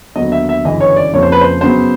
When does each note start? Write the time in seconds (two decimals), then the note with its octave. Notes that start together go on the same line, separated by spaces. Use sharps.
0.16 D#2 D3 F#3 B3 D#5
0.32 E5
0.49 E5
0.64 G1 F#2 C#3 E3 D#5
0.81 C#5
0.96 D5
1.13 F2 C#3 F3 A#3 C#5
1.23 C5
1.32 B4
1.41 C5
1.61 F#2 C#3 F#3 B3 C5